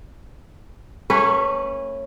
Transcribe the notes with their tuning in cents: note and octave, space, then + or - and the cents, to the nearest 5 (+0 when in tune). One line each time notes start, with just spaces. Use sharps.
A3 +40 C#4 -15 B4 +0